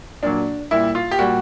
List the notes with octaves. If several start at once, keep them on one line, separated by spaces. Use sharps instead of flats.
A#2 F#3 D4
A#2 G3 E4
F4
G4
A#2 G3 F#4